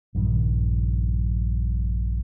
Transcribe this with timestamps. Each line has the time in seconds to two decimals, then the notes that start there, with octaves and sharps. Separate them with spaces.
0.15 A#1 G2 D#3 G3